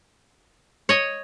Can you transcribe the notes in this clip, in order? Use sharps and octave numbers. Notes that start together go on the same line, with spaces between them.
C#5 D#5